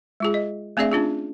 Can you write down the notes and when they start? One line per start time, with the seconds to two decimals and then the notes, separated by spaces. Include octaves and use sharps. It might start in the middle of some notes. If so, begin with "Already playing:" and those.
0.20 G#3 F4 G#4
0.34 D#5
0.77 A3 C4 D4 G#4 D5 E5
0.92 C#4 D4 F4 G#4